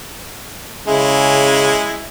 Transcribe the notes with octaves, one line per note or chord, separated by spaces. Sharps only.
C#3 G#3 E4